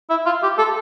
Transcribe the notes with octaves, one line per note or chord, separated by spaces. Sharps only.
E4
F4
G4
A4